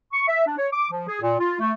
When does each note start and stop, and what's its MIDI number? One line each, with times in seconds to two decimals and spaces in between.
0.13 0.24 85
0.28 0.45 76
0.46 0.55 62
0.58 0.67 73
0.73 0.88 86
0.91 1.08 53
1.08 1.19 68
1.21 1.36 46
1.39 1.56 65
1.60 1.72 57